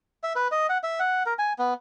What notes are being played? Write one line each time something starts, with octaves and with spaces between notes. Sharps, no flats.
E5
B4
D#5
F#5
E5
F#5
A#4
G#5
B3